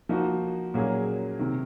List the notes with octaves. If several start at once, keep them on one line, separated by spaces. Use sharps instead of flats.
F3 A#3 D#4 F#4
A#2 F#3 A#3 C#4 G#4
C3 D#3